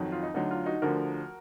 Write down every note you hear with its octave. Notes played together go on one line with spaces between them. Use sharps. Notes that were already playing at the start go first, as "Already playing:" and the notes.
Already playing: F2 D#3 F#3
F4
D#4
D2 D3 F#3 D#4
F4
D#4 F#4
D2 D3 F3 F#4 A#4